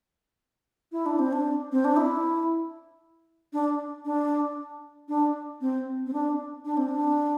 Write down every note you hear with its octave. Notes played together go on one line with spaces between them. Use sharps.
E4
D4
C4
D4
C4
D4
E4
D4
D4
D4
C4
C4
D4
D4
C4
D4